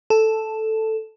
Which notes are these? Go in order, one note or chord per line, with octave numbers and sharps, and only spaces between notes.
A4